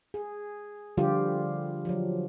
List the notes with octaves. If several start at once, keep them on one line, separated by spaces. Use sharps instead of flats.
G#4
D3 F3 G3 F4 G4
F3 F#3